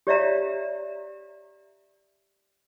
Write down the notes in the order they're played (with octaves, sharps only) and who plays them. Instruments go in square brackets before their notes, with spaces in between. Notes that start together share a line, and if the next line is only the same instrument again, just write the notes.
[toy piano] G4 C#5 D5 E5 F5 A#5